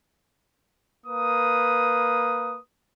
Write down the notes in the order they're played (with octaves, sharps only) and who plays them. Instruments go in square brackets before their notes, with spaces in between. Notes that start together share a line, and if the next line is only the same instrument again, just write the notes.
[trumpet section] A#3 B4 D#6